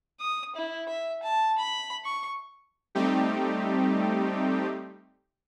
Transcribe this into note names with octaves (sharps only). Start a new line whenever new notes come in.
D#6
E4
E5
A5
B5
C#6
G3 A3 C4 D#4 G4